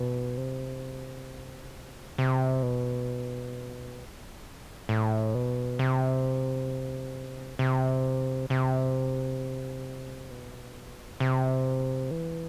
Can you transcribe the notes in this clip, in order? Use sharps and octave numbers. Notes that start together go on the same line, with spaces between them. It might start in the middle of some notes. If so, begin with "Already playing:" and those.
Already playing: B2
C3
C3
B2
A2
B2
C3
C3
C3
B2
C3
E3